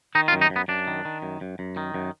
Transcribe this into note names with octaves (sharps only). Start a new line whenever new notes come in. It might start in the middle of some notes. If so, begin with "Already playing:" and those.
D#3 D#4
F4
F#2
D#4
F#2
B3
F#2 D4
D#3
D#3
F#2
F#2
F#2
D#3
F#2